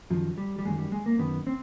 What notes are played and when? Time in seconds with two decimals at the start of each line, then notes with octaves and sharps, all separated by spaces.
0.10 F#2 D#3 F3
0.38 G3
0.59 G3
0.65 F#2 D#3 G#3
0.78 G3
0.92 G#3
1.06 A#3
1.19 F#2 D#3 B3
1.47 C4